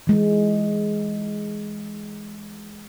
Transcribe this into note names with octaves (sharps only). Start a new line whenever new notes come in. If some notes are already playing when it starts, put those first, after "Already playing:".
E3 G#3